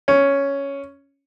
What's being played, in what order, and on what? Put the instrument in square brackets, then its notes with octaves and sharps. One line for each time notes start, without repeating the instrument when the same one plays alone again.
[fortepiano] C#4